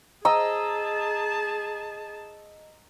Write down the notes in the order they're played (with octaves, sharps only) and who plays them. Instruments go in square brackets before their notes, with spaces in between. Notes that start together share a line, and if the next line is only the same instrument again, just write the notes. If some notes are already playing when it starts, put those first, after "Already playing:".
[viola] G#4 A5 [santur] D#5 A#5 E6